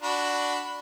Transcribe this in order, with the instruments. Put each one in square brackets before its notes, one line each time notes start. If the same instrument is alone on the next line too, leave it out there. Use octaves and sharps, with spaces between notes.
[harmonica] D4 F#4 B5